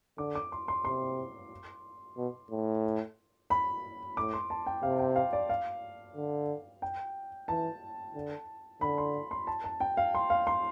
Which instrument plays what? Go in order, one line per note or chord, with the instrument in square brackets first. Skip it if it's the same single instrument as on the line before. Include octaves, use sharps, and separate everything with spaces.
[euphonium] D3 [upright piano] D6
[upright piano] D6
C6
C6
[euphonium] C3 [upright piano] C6
[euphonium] B2
A2
[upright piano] B5
[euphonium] A2 [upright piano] D6
[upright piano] C6
A5
G5
[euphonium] C3 [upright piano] F5
[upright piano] G5
F5
D5
F5
[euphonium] D3
[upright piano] G5
[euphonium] E3 [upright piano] A5
[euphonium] D3
[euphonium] D3 [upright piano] B5
[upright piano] C6
C6
A5
A5
G5
F5
C6
F5
C6